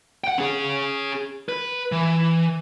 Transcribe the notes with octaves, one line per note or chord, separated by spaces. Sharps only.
F#5 G5
C#4 G#4
B4
E3